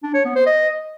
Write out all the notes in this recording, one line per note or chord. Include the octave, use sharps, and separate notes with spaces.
D4
C#5
B3
C5
D#5